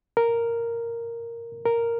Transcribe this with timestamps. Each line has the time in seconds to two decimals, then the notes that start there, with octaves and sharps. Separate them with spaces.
0.17 A#4
1.65 A#4